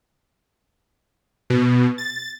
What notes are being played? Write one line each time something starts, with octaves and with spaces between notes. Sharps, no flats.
B2
A6